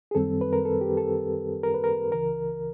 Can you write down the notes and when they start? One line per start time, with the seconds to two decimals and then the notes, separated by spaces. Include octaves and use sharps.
0.11 G#4
0.15 F#2 D#3 G3 C4 A4
0.41 B4
0.53 A#4
0.65 A4
0.81 G4
0.97 A4
1.64 A#4
1.74 B4
1.84 A#4
2.12 C#2 C#3 E3 A#4